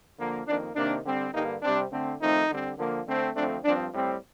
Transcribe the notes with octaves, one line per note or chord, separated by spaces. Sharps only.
D3 F3 A#3
F2 D#3 A#3 D4
C3 D#3 A#3 D4
D3 G3 C4
G2 D3 G3 A#3 D#4
C3 G3 C4 D4
D3 A3 C4
F2 D#3 A3 C4 D#4
D3 G3 C4
D3 F3 A#3
D3 A3 C4
F2 D3 A3 C4 D4
G2 F3 C4 D4
A2 G3 C4